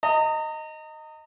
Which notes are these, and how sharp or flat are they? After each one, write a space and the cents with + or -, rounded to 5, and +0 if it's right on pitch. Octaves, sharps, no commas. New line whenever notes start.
D#5 +0 A#5 -35